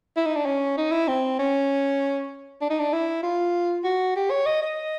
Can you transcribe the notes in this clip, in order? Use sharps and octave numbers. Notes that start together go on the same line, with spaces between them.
E4
D#4
D4
C#4
D#4
E4
C4
C#4
D4
D#4
D4
E4
F4
F#4
G4
C#5
D#5
D#5